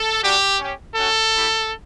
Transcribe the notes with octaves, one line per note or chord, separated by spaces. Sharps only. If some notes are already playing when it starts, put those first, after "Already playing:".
Already playing: A4
G3 D4 F#4 G4
C#4 G4
C#4 F#4 A4
A3 E4 G4